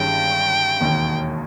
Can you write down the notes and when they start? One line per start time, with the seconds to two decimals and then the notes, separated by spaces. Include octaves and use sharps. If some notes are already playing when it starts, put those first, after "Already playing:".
Already playing: G1 G2 D#3 G#3 C#4 G5
0.80 E1 D#2 D#3 A#3